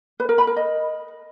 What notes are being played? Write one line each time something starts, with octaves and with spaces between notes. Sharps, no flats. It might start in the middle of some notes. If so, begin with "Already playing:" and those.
B4
A#4
B5
A#4
D#5